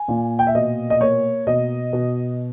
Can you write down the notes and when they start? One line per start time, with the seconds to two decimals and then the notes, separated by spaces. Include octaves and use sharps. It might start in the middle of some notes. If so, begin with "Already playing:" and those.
Already playing: G#5
0.08 A#2
0.39 G5
0.47 E5
0.55 B2 D#5
0.90 D#5
1.01 A#3 C#5
1.47 B2 D#5
1.93 B2